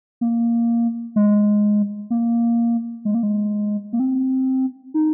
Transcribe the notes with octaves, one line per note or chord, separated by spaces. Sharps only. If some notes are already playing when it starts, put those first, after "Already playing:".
A#3
G#3
A#3
G#3
A#3
G#3
A#3
C4
D#4